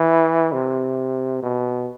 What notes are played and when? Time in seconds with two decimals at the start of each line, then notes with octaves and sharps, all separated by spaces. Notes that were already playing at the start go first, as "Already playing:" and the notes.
Already playing: E3
0.53 C3
1.43 B2